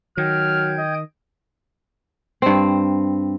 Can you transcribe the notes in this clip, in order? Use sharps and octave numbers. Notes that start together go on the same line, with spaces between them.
D#3 F#3 G5 F6 G6 G#6
D#5
G2 C4